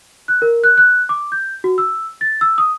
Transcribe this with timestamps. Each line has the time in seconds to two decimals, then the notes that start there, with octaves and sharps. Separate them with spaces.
0.28 F#6
0.42 A#4
0.64 F#6
0.78 F#6
1.09 D6
1.32 G6
1.64 F#4
1.78 E6
2.21 A6
2.41 E6
2.58 D#6